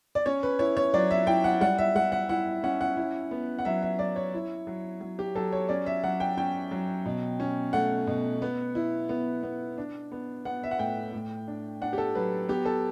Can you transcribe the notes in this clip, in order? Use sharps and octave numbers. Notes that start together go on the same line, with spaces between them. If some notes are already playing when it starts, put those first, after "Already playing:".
D5
C#4 C#5
B4
E4 C#5
C#5
F#3 D5
E5
E4 G5
F#5
G3 F#5
E5
G3 F#5
F#5
E4 F#5
C#4 F#5
F#5
E4
B3
F#5
F#3 E5
E5
F#3 D5
C#5
E4
F#3
F#3
G4
F#3 A4
C#5
C#4 D5
E5
F#3 F#5
G5
C#4 G5
F#3
B2
C#4
A3 F#5
B2
B3
E4
B3
B3
D4
B3
B3 F#5
E5
F#5
A2 G5
A2
D4
D4 F#5
G4
A4
F#3 B4
B3 G4
A4